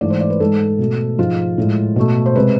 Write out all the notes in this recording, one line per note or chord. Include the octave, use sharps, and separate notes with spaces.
G#2 E3 A3 D5
C5
D5
B4
G#2 G#3 A4
B2 A3
G#2 F3 G#3 F4
A2 G#3
B2 A3
C5
C3 G#3 B4